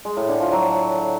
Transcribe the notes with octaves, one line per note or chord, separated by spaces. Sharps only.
G#3
A2
D3
F3
F#3